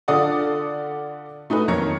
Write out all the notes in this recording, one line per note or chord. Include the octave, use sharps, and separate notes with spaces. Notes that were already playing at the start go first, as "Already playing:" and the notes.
D3 F4 A4 D5 F#5 D#6
A3 D#4 F#4 B4
F2 D#3 A#3 C#5 A#5 C#7